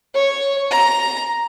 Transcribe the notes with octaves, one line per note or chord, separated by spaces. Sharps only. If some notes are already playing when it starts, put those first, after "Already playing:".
C#5
A#5